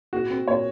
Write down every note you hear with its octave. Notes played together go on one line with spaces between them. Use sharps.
A#2 F#4
C4
A#2 C#5